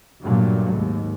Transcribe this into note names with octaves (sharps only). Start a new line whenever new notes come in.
G2 A#2 F#3 A3
D#2 G#2